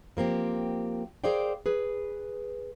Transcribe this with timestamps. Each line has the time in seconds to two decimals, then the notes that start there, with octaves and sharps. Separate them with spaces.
0.17 F3 A#3 C4 G4
1.24 G#4 A#4 C5 D5 F5 G5
1.66 G#4 B4